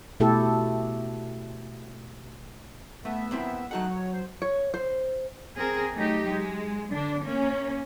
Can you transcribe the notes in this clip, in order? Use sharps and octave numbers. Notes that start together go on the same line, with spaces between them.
B2 A3 E4 G4 A4
A3 B3 E5
A#3 C4 E4
F#3 A3 D#4 F#4 F#5 F#6
C#5
C5
C#5
C5
C4 G#4 A#4
F#3 A3 D#4 G4
G#3
D3 D4
A#3 C#4